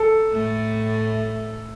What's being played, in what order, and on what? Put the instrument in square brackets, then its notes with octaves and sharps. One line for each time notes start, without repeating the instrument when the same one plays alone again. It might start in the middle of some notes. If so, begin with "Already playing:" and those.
Already playing: [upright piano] A4
[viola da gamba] A2 A3